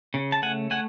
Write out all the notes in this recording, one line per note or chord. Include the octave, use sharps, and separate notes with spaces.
C#3
A5
A3 F#5 G#5
A3 F#5 G#5